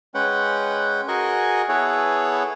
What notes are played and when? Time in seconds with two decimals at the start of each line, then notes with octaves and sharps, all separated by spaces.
0.14 G#3 C#4 B4 F#5 G5
1.08 F#4 G#4 A#4 D#5 G#5 C#6
1.69 B3 E4 G#4 A4 B4 C#5